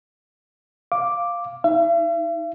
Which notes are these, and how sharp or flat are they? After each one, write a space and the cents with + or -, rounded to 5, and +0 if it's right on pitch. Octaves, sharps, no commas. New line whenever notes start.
F5 +0 D6 +0
D#4 +25 E5 +45